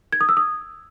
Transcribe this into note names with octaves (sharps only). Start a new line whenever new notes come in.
G#6
D#6
E6
D#6